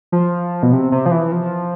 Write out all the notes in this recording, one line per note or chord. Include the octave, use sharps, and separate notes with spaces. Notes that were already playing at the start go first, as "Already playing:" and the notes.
F3
B2
C3
C3
F3
E3
F3